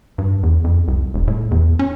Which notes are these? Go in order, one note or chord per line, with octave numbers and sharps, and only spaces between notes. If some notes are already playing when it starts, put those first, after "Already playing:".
G2
E2
F2
C2
E1
A2
E2
C#4